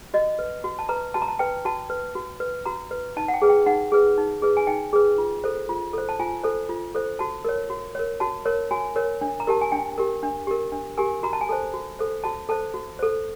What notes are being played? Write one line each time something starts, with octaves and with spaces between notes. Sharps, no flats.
F#4 D#5
B4
F#4
A5
B4 A#5
F#4 A5
A#5
A5
B4 G5
F#4 A5
B4
F#4
B4
F#4 A#5
B4
D#4 A5
F#5
G5
G#4 B4
G5
D#4 F#5
G#4 B4
D#4
G#4 B4
G#5
D#4 G5
G#4 B4
F4
A4 C5
F4
A4 C5
A5
F4 G#5
A4 C5
F4
A4 C5
F#4 A5
A#4 C#5
F#4
A#4 C#5
F#4 A5
A#4 C#5
F#4 G#5
A#4 C#5
D4
A#5
G4 A#4 A5
G#5
D4 G5
G4 A#4
D4
G4 A#4
D4
G4 A#4 G#5
F#4 A#5
A5
G#5
A4 C5 A5
F#4
A4 C5
F#4 A5
A4 C5 A5
F#4
A4 C5